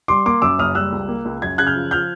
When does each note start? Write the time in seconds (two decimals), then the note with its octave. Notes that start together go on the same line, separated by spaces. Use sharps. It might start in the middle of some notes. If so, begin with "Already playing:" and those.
0.08 G3 C6 D6
0.26 A#3 C6 D6
0.42 F#2 D6 E6
0.59 F#1 D#6 F6
0.75 G3 E6 F#6
0.92 C#2
1.08 A#3
1.25 C#2
1.42 F#2 G#6
1.58 C#3 F#6 G#6
1.67 F6 G6
1.75 F3
1.91 F3 F6 G6